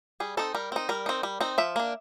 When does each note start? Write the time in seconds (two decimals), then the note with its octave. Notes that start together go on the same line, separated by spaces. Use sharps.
0.20 G3 G#4
0.37 C4 D#4 A4
0.55 G3 A#4
0.72 C4 D#4
0.89 G3 A#4
1.06 C4 D#4
1.23 G3
1.41 C4 D#4
1.58 F3 E5
1.76 A#3 D4